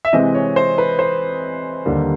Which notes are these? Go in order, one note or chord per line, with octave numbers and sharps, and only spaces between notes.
E5
C3 E3 G#3 C4 D#5
C#5
C5
B4
C5
D#2 D3 G3 A#3